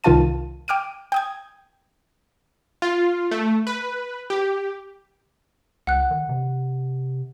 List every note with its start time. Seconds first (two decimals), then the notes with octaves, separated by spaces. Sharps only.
0.04 C2 D#3 F4 F5 A5 D#7
0.68 G5 D6 F6 D7 D#7
1.12 G5 D#6 G#6
2.82 F4
3.31 A3
3.67 B4
4.30 G4
5.87 C#2 F#5 F#6
6.11 D#3
6.29 C3